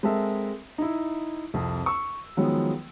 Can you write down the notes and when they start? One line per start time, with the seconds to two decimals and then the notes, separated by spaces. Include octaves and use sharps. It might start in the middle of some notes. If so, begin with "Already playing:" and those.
0.03 G#3 C4 A4 A#4 E5
0.78 D#4 E4
1.54 C2 F2
1.86 C#6 E6
2.37 D#3 F3 F#3 G#3 B3